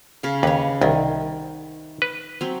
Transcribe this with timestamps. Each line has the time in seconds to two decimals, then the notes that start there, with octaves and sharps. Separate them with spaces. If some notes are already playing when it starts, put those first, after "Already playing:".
0.23 C#3 F5
0.43 D#2 B4 C#5
0.82 C2 D#3
2.02 B4
2.41 F#3 C4